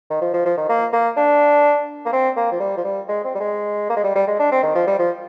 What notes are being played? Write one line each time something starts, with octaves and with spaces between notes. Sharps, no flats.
D#3
F3
F3
F3
D#3
A#3
A#3
D4
A#3
C4
A#3
F3
G3
F3
G3
G#3
C4
G3
G#3
A#3
G#3
G3
G3
G#3
D4
C4
D#3
F3
G3
F3